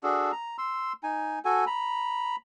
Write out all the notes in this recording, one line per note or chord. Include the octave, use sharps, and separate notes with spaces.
D4 F#4 G#4 A4
A#5
C6 E6
D#4 G#5
F#4 A4 G#5
A#5 B5